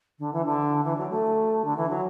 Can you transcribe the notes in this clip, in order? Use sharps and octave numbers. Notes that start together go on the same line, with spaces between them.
D3
E3
D3
E3
F#3
A3
D3
E3
F#3